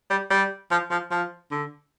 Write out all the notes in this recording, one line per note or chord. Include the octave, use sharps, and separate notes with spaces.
G3
G3
F3
F3
F3
D3